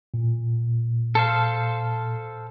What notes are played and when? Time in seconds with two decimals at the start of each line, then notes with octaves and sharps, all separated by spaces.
0.14 A#2
1.15 A4 C5 F5